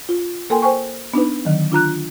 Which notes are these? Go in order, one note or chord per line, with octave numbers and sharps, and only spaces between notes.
F4
A#3 A4 A#4 G5 G#5 C6
C5 G5 G#5 C#6
B3 D4 D#4 B4
D3 D#3 F#3
D4 F4 A#5 F#6